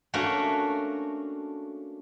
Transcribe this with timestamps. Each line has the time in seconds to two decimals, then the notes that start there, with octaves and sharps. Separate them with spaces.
0.14 A3 A#3 C#4 D4 F#4